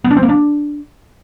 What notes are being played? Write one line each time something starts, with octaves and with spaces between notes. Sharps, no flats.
B3
D4
C4
A#3
D4